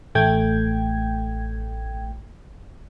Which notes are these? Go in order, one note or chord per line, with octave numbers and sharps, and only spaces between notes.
A1 A3 G5 G#6